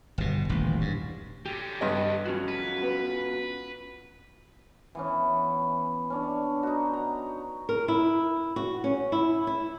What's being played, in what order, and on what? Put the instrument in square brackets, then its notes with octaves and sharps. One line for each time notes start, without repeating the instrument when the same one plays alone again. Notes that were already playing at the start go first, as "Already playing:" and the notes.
[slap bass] G1 B2
D#1 A1
G2
[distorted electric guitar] D3 C#4 [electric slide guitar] G4
[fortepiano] G2 D#5
[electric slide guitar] C#4 F4 F#4
[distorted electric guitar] B4
[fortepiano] B3
[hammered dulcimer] E3 B3 C#4
C#4 D4
D#4 F#4
A#5
[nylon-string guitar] A#4
E4
F#4
C#4
E4
E4